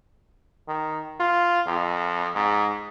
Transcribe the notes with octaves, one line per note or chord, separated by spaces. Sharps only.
D#3
F4
F2
G#2